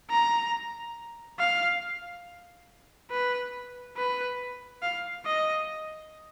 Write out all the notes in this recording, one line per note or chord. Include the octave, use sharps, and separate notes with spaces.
A#5
F5
B4
B4
F5
D#5